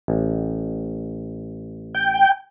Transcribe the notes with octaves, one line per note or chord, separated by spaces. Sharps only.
A1
G5